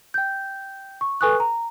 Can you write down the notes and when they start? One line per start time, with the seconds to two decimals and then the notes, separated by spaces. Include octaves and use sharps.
0.14 G5 G6
1.01 C#6
1.21 A4 B4 G#5 C#6 D#6 F#6
1.40 A#5